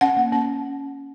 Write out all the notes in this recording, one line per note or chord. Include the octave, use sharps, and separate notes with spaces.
C#4 F#5
A#3
C#4